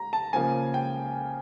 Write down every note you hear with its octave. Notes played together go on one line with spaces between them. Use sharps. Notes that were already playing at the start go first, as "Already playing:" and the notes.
Already playing: A#5
A5
C#3 F3 A#3 G#5
G5